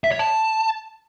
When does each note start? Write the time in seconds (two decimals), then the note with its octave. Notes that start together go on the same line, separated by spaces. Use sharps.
0.04 E5
0.12 C#5
0.19 A5